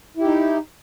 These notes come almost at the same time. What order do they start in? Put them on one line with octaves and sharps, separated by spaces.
E4 G4 D#4